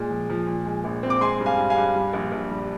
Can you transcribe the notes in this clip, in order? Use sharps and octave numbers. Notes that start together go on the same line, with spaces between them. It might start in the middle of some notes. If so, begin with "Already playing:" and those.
Already playing: A#2 G#3
F3
F3
A#2
G#3
A#1
C4
D6
G#3 G#5 C6
G2
F5 G#5
G2
F5 G#5
G2
G3
A#1
A#1
G3